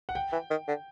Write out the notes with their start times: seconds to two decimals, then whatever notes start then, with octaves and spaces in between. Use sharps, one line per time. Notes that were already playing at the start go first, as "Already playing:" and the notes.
0.09 F#5
0.15 G5
0.33 E3
0.50 D#3
0.68 D3